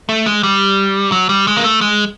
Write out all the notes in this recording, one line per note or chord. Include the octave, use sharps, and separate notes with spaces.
A3
G#3
G3
F#3
G3
G#3
A#3
A3
G#3